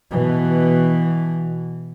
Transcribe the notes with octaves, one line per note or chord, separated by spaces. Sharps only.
B2 E3